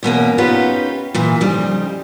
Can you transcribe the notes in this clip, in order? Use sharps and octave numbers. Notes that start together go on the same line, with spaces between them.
E2 B2 A#3 C#4
B3 C#4 D#4 F4 G4 B4
A#2 E3
F2 C#3 G3 D#4